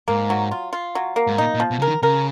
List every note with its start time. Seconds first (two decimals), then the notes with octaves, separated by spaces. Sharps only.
0.08 G#2 A#3
0.30 F#3
0.51 F4
0.73 F4
0.95 F#3
1.16 A#3
1.27 G#2
1.38 A#2 D#4
1.54 A#2
1.60 F3
1.71 B2
1.80 C#3 A#4
1.87 D#3
2.03 C#3 A#4